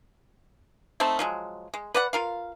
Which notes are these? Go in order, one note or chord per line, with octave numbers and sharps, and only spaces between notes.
A3 C4 D#4 A5
F3 F#3 G#3
G#3
B4 D5 F#5
F4 A#4 F5